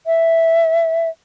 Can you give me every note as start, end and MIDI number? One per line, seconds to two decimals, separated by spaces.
0.07 1.09 76